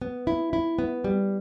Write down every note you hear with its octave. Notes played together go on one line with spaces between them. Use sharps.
B3
E4
E4
B3
G3